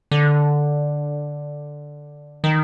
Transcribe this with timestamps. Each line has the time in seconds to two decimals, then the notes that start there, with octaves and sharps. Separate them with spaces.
0.11 D3
2.44 D#3